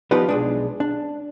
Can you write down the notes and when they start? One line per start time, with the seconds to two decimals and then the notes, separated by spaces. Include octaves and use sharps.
0.11 F3 B3 D#4 F4 G4 B4
0.29 B1 G#3 D4
0.80 D4